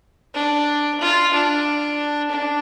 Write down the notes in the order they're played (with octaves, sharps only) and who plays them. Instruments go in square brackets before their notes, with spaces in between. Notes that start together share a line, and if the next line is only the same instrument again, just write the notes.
[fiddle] D4
F4
D4
D4